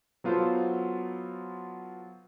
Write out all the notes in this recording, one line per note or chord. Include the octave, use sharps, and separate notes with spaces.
F#3 B3 F4 A4 C5